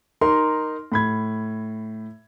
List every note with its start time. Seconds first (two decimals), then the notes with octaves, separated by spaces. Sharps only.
0.21 D#4 A#4 C6
0.92 A2 B5 G#6